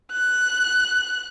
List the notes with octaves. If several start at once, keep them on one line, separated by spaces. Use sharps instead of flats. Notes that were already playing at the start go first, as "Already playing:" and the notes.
F#6